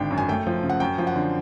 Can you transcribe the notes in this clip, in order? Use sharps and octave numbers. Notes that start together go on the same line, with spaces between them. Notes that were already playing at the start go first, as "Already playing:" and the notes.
Already playing: G#1 D3 G5
F#2
G#5
A3 G5
F3
C#3
F#5
F#2 G5
F3
F#5
D3